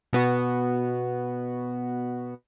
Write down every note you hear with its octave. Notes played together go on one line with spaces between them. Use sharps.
B2 B3 F#4